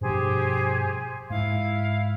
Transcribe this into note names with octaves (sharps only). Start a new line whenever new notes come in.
G2 B2 F3 G4 G#4 C5
G#2 E4 F5